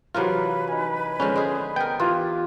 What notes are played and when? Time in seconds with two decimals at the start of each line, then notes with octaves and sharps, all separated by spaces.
0.15 C3 E3 F#3 F4 A#4 B4
0.68 D#4 G#5
1.20 D3 F3 G#3 C#4
1.36 G#4 C5 D#5
1.76 B3 A#4 G5
2.00 E3 F4 G4